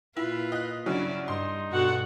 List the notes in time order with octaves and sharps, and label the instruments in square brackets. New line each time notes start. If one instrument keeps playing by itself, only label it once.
[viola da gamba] A#2 F4 [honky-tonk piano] E4 [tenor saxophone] B4
[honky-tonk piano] D#5 F#6
[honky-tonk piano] G2 C#3 F#3 [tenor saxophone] C#4 [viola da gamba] E4 D5
[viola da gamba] G2 [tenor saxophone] D#4 [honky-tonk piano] C6
[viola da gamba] G2 B2 A4 [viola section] F#4 F#5